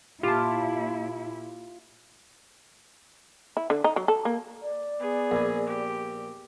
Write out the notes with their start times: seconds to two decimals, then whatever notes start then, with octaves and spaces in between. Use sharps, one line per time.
0.23 A#2 E4 F4 G4 A5
3.57 E4
3.70 D3
3.84 D#4
3.96 F#3
4.08 A4
4.25 A#3
4.63 D5
4.99 B3 G#4
5.32 A#1 G#5
5.67 G4